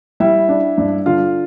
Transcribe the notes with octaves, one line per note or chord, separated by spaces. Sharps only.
G3 E4 E5
D4
G2
D3 F4 F5